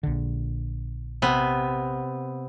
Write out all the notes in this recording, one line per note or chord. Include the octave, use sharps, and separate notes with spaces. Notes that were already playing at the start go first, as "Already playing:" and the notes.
A#1 D3
C3 B3